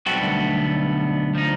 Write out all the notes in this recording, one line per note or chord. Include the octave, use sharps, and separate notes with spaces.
B1 F#3 G3 B3 C4 F#4 A4 D5
D2
F3 D#4